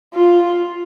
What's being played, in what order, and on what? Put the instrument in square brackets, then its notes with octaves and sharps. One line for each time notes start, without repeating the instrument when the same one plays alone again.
[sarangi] F4